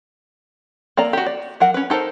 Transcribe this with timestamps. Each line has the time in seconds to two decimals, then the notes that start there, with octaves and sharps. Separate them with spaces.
0.97 A#3 A4 D5 A#5
1.13 F#4 G4
1.26 D5
1.60 F#3 A#4 F#5
1.74 C#4 B4
1.90 D#4 A4 A#4 C5